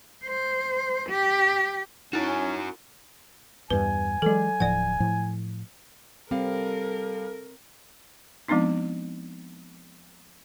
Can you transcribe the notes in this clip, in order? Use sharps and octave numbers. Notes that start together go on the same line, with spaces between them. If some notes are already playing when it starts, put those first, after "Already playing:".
C5
G4
C#4 D#4 E4 F#4 A#4
E2 G2 B4 G#5
E3 F#3 G#3 A4
D1 A2 F3 D5 F#5
A2 F3
G3 C4 A4 A#4 F5
F3 G#3 B3 C4 D4 D#4